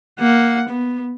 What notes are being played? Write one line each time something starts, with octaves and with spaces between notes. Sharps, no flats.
A#3 F#5
B3